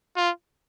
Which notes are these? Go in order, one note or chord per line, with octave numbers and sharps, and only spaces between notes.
F4